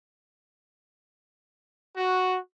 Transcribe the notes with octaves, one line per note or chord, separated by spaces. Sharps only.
F#4